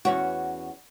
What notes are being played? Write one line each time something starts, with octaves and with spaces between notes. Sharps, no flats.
E2 C#4 F#4